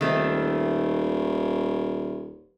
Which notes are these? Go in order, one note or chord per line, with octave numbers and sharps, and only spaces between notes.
D#1 D#3 A3 C4